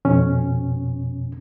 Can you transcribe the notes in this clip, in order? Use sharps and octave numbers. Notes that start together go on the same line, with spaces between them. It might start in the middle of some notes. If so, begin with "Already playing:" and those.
F2 B2 C#4